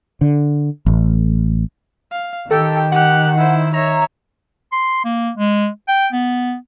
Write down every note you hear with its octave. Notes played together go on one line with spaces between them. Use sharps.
D3
A1
F5
D#3 G4 A4 G5
G4 F#5 F#6
E4 C5
C#5 E5 A#5
C6
A#3
G#3
G5
B3